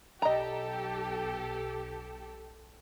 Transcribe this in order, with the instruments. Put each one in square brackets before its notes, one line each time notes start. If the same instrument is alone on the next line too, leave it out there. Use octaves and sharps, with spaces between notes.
[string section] B1 G4 A4 [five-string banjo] D#5 A#5